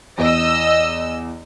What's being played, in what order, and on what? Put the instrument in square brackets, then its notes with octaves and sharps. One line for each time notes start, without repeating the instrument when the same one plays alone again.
[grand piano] E2 [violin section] D#5 E6